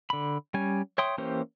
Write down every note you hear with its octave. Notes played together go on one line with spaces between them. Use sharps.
D3 B5
G3 C#4 G#5
C#5 E5 G5 C6 D#6
E3 A#3 C#4 G4 C5